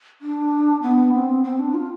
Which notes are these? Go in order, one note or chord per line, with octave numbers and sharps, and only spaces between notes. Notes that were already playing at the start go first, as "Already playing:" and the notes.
D4
B3
C4
C4
D4
F4